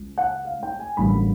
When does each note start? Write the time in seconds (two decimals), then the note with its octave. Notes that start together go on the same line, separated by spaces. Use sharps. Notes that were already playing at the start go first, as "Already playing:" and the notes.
Already playing: C#2
0.18 F#5
0.45 F5
0.63 G5
0.79 G#5
0.97 A1 G2 D3 F#3 A#3 B5